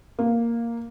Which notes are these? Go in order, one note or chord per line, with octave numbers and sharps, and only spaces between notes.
A#3